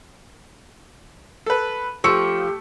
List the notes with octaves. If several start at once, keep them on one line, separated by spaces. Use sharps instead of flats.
A4 B4
F3 A3 G4 C#6 E6 C#7